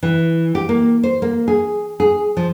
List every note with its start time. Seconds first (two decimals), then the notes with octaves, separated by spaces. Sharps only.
0.03 E3
0.55 G4
0.69 A#3
1.03 C5
1.22 A#3
1.48 G#4
2.00 G#4
2.37 F3